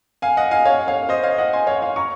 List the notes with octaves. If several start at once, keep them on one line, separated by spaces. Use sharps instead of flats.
F5 G#5
D#5 F#5
F5 G#5
C#5 F5
C#5 F5
C5 D#5
C#5 F5
D#5 F#5
G#5 C6
C#5 F5
C#5 F5
A#5 C#6